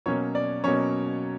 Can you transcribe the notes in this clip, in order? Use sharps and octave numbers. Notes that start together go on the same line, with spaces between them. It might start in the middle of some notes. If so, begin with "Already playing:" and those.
B2 F#3 A#3 C#4 C#5
D5
B2 F#3 A#3 C#4 C#5